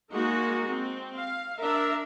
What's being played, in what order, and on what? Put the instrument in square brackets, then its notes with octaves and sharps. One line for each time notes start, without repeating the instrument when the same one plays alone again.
[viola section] G#3 A#3 D#4 F#4
C4
F5
D4 A#4 E5